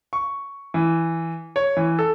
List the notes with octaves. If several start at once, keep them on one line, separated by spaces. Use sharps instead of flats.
C#6
E3
C#5
E3
A4